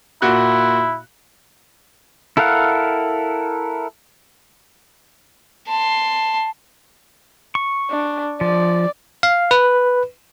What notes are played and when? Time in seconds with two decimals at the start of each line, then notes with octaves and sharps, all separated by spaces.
0.22 A#2 E4 F#4 F#6
2.37 E4 A4 A#4 F5 F#5
5.68 A5 C6
7.55 C#6
7.90 D4
8.41 F3 D5
9.23 F5
9.51 B4